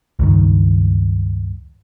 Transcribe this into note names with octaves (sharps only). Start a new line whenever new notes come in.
C#2 G2 D#3